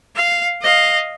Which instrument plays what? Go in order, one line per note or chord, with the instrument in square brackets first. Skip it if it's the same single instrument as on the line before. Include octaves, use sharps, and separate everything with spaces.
[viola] F5
D#5 F5